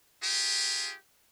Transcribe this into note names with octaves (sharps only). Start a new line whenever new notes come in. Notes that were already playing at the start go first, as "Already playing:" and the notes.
F4 G4 G#4